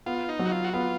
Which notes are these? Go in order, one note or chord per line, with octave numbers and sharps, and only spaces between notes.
B3 F4
D#4
F#3
F#4
F4
F#4
B3 F4